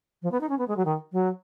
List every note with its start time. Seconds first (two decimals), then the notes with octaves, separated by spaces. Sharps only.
0.22 F3
0.32 B3
0.41 D#4
0.49 C#4
0.58 B3
0.68 G#3
0.77 F#3
0.85 D#3
1.12 F#3